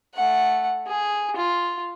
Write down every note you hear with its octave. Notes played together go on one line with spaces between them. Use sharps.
A3 F#5
G#4
F4